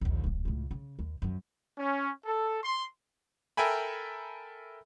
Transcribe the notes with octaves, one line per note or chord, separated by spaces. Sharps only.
A#1 D#2
D1 A#1
C#2 A2
C#3
D#2
F#2 F3
C#4
A4
C6
A4 A#4 E5 G5 G#5 B5